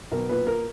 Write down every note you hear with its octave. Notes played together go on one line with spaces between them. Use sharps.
B1 A#4
A#2 B4
A#4